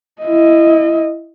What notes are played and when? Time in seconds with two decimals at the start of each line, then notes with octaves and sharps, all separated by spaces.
0.22 E4 D#5